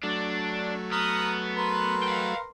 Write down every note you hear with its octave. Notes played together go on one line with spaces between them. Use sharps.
F#3 A3 D4
B3 A#5 D#6 F6
A#4 B4 C6
F5 G5